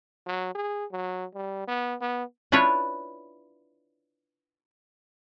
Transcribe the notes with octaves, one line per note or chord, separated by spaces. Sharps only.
F#3
G#4
F#3
G3
B3
B3
D4 E4 F4 B4 C#5